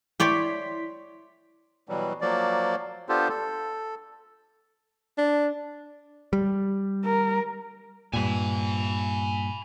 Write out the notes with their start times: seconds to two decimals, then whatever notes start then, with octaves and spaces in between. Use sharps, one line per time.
0.20 E4 C#5 D5 G5 C6 B6
1.89 B2 E3 F#3 G3
2.21 F3 F#3 A#3 D5
3.09 B3 D4 F4 G4 A4 C5
3.29 A4
5.18 D4
6.33 G3
7.05 A#4
8.13 G2 A#2 G#5 B5